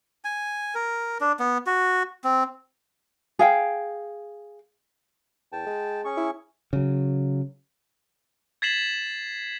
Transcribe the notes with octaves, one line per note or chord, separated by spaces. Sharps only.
G#5
A#4
D4
B3
F#4
C4
G#4 F5 G5
E2 G5 A5
G#3
C#4 G#4 C#6
E4
C#3 F#3
G#6 A6 B6 C7 E7 F#7